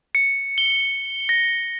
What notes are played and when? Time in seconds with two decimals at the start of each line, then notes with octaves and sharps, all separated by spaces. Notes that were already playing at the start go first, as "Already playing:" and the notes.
0.15 C#7
0.58 G7
1.29 A#6